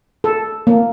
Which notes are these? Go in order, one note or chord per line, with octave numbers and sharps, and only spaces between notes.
A4
A#3